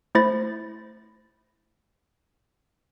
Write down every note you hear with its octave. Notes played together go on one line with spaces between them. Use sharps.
A3 E4 C5 B5 A6 A#6